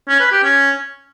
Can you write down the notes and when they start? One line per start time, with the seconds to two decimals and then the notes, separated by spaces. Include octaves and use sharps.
0.08 C#4
0.20 B4
0.32 G4
0.43 C#4